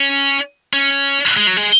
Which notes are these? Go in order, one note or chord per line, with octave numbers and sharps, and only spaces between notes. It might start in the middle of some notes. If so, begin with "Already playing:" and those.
Already playing: C#4
C#4
G#3
F#3
G#3